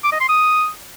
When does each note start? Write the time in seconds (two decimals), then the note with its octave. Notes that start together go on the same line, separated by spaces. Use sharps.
0.04 D6
0.12 D#5
0.20 C6
0.28 D#6